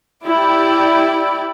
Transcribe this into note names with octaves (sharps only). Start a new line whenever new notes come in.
E4 G4 D5